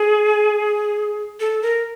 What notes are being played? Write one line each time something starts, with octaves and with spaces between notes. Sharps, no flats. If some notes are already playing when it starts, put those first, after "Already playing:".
Already playing: G#4
A4
A#4